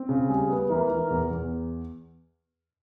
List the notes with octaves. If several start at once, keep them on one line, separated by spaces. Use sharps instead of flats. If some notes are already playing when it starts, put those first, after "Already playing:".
Already playing: C4
C#3
G3 G#4
B3
E3 A#4
E3
E2
E2